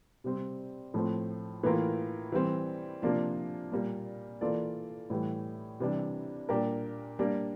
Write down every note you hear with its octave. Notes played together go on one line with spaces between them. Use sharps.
C3 G3 C4
A2 F3 A3 C4
A2 E3 A#3 F4 A#4
E3 G3 C4
C3 F3 A#3 D4 F4
A#2 G3 A#3
E3 A#3 F4 A4 D5
A2 E3 G3
C3 E3 G3 D4
A#2 G3 D4 G4 A#4
G3 A#3 D4